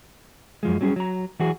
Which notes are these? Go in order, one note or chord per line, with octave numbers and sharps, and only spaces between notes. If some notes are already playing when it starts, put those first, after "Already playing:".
F#2 F3 G#3
F#3 G3 C#4 E4 G#4
F#3 A#5
E3 F#3 F#4 G#4